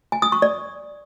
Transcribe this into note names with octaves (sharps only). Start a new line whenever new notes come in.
G#5
D#6
C#6
D5